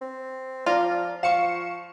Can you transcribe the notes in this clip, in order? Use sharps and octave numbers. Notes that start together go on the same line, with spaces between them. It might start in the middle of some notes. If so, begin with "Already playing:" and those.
C4
F3 F4 D5 A#5 F6
F3 F5 C#6 C#7 E7